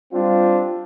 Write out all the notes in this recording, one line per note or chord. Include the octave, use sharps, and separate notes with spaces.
G3 C4 D4 F4